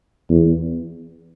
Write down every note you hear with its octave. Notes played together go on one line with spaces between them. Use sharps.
E2